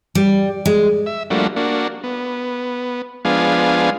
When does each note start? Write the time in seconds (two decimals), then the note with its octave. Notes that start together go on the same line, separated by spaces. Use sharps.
0.15 G3
0.66 G#3
1.06 E5
1.30 F3 G3 A3 A#3 D4 F#4
1.56 A#3 D4 F#4
2.04 B3
3.25 F3 G#3 B3 D4 F5 G#5